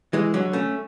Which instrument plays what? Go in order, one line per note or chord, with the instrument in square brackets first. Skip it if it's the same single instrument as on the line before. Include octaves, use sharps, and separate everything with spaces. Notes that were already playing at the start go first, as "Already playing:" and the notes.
[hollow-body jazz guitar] E3 G#3
D3 F#3
A3 C#4